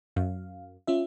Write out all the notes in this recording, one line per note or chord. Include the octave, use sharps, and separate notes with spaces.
F#2 F5
C#4 F4 E5